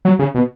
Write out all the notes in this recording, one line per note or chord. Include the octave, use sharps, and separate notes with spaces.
F#3
C#3
B2